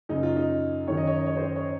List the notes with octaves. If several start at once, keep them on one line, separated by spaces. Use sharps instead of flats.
F#2 C#3 D#4
F4
D#4
F#2 D#3 C#5
D#5
C#5
D#5
C#5
C5
C#5
C#5